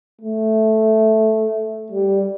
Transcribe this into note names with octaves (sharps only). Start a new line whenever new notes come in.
A3
G3